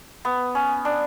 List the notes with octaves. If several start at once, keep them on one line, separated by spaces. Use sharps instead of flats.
B3
C#4
D4